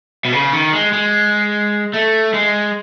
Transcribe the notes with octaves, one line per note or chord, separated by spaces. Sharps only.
B2
C#3
D#3
G#3
G#3
A3
G#3